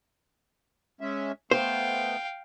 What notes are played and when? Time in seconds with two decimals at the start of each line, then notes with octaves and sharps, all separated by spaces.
1.01 G#3 C#4 E5
1.51 A3 B3 C5 F5 G5